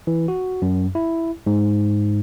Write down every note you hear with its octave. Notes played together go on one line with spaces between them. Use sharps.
E3
F#4
F#2
E4
G#2